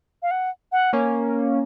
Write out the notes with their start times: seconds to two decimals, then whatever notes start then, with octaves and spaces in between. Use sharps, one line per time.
0.23 F5
0.31 F#5
0.72 F#5
0.93 A#3 C#4